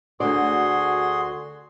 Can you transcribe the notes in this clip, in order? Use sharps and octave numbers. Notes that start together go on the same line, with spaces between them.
D2 D3 F#4 G#4 D5 C6